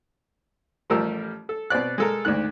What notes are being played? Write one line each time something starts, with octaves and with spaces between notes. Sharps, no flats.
A1 F3 G3 A3 A#4 E6
A4
B2 C4 D5 F#6
G#3 A4 A#4
D2 G#2 D#3 F#6